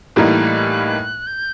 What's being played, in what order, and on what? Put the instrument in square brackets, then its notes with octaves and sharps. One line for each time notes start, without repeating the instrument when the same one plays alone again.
[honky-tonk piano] A2 E3 G3 A#3 D#4 [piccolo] F#6
[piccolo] G6